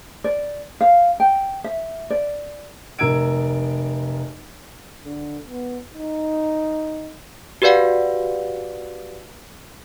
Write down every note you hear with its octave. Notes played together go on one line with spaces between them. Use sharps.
D5
F5
G5
E5
D5
F1 A#4 E6 G#6 D7
D3
B3
D#4
F#4 G4 B4 D5 F5 F#5